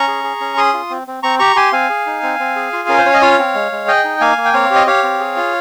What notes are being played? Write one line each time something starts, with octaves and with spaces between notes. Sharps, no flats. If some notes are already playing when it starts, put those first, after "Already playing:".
Already playing: C#4 A#5 C#6
G#4
G#4
C#4
G#4 C6 D#6
F4
C4
C4
C4 A#5 C#6
G4 A#5 C#6
G4 G#5 C6
C4 F5 G#5
G#4
D#4
C4
C4
G#4
F4
C#4 A#4
C5
C#4 C#5
D#5
F4 C#5 F5
C4
G#3
G#3
G#4 D#5 G5
D#4
A#3 F5 G#5
A#3
G5
C4 C#5 F5
G4 D#5
G4 C#5 F5
C4
G#4
F4